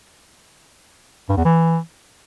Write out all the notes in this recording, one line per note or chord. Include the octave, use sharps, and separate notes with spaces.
G2
E2
E3